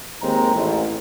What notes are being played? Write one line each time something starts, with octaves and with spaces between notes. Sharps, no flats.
D#2 G#3 C4 A#5
A1